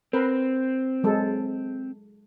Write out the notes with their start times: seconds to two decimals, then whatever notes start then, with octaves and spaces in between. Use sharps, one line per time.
0.13 C4 A#4 B4
1.03 F#3 G#3 A4